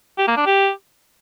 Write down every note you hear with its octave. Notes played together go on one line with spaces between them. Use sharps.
G4
A#3
D4
G4